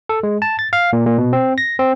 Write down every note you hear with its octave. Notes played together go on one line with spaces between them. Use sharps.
A4
G#3
A5
A6
F5
A#2
A#2
B2
C4
A#6
C4